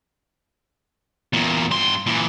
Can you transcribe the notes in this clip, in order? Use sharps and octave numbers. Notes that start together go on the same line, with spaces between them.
E2 A#2
G2 C6
A#2 E3